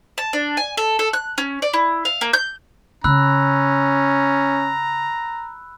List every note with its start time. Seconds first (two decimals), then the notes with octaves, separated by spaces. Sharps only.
0.18 A5
0.33 D4
0.57 G#5
0.77 A4
0.99 A4
1.13 F#6
1.38 C#4
1.62 D5
1.73 E4
2.05 F5
2.21 A#3
2.33 G6
3.04 C#3 C#4 A#5 B5 E6 F#6